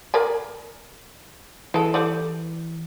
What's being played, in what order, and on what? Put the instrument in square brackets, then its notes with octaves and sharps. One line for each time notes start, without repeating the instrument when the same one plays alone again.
[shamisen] A#4 D5 G#5
[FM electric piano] E3 [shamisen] G#3 A4
[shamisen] G3 A3 D5